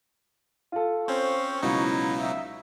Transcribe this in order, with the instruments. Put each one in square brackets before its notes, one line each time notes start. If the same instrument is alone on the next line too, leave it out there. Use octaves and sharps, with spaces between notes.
[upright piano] F4 A4
[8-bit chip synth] C4 C#4 [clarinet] C5 [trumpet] C#6
[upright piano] C#2 [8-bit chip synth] B2 F#3 D#4 [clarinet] E4
[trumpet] E5